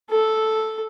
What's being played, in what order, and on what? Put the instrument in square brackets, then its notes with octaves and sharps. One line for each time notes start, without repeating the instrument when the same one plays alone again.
[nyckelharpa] A4